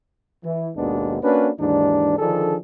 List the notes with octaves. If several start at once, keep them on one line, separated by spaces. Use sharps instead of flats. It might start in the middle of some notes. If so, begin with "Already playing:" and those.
E3
G#1 D#2 B2 G#3 B3 D4
A#3 C#4 D4 F#4 B4
D#2 G#2 E3 D4
D3 D#3 F3 D4 G#4 A4